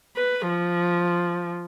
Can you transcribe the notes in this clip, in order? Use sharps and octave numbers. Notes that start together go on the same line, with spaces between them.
B4
F3